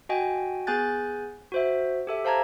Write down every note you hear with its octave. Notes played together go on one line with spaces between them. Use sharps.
F#4 D#5 G5 G#5
B3 G#4 G#5 F#6 G6 A6
F#4 C5 E5
G4 A4 E5
C5 F5 A5 A#5 G#6